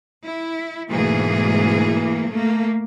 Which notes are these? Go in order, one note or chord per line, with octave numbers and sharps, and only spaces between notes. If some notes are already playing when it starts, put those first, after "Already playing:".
E4
D2 G#2 B2 E3 A#3 G#4
A3 A#3